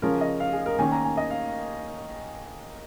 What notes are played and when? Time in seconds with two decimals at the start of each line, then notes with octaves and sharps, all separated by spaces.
0.02 C#3 F3 C#4 A#4
0.21 D#5
0.40 F5
0.53 G#4
0.66 A#4
0.79 D#3 A#3 C#4 G#5
0.92 A#5
1.05 G#5
1.17 D#5
1.30 F5